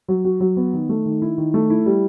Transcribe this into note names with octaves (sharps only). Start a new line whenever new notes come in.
F#3
F#4
F#3
B3
D#3
A3
D#3
E4
D#3
A3
E4
G3